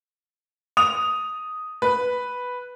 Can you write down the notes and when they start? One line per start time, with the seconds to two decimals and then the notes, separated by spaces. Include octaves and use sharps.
0.77 D#6 F7
1.82 B4